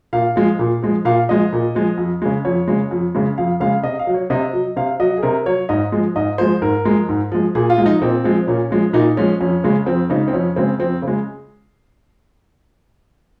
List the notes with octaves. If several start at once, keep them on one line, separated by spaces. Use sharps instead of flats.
A#2 F5
F3 G#3
A#2
F3 G#3
A#2 F5
F3 G#3 D#5
A#2
F3 G#3
F2
C#3 G#3
F2 C#5
C#3 G#3
F2
C#3 G#3
F2 F5
C#3 G#3 F5
C3 D#5
F5
F#3
C#5
C3 D#5
F#3
C3 F5
F#3 D#5
G#4
C3 A#4
F#3 C#5
G#2 D#5
F3 G#3
G#2 D#5
F3 G#3 C5
G#2 A#4
F3 G#3
G#2
F3 G#3
A#2 G#4
F4
F3 G#3
D#4
A#2 C4
F3 G#3
A#2 C#4
F3 G#3
A#2 D#4
F3 G#3 C#4
F2 C#4
C#3 G#3
F2 C4
C#3 G#3 D#4
C4
F2 C#4
C#3 G#3 C4
F2 C4
C#3
G#3